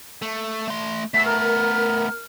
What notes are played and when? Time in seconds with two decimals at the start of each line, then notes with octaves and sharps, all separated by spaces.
0.22 A3
0.68 A3 C6
1.14 A3 B3 E6 B6 C7
1.26 A#4 F6